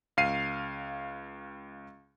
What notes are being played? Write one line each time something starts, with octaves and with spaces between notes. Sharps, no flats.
C#2 F5 C7 D#7